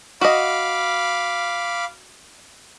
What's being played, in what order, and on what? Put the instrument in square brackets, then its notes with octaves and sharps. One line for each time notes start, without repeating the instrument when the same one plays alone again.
[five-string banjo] F#4 D#5 [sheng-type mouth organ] F5 B5 D6